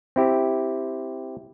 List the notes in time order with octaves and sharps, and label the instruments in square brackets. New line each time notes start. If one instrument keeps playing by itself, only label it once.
[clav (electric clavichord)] C4 E4 G4